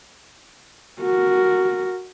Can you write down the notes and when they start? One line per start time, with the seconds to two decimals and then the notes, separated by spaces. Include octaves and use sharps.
1.02 F#4 A#4